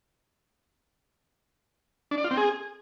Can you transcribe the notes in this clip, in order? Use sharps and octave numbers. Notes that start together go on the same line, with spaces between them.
D4
D5
F4
C4
G#4